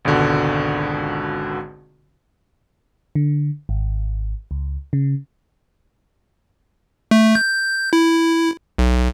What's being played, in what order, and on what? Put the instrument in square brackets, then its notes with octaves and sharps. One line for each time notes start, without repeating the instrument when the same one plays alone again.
[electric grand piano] G#1 C#2 B2 D3 F#4
[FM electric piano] D3
G#1
C#2
C#3
[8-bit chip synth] A3
G6
E4
B1